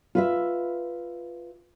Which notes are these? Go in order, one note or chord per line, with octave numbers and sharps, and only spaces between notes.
F4 B4 E5